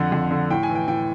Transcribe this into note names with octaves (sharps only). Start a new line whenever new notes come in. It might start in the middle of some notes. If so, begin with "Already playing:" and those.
Already playing: F2 D3 F#5
F2
D3
A2 G5
G#5
E3
G5
A2 G5